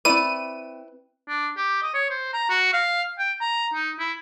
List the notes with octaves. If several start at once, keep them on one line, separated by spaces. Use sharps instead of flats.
C4 E4 B4 D5 D#7
D4
G4
D#5
C#5
C5
A#5
F#4
F5
G5
A#5
D#4
E4